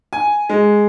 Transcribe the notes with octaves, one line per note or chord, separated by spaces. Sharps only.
G#5
G#3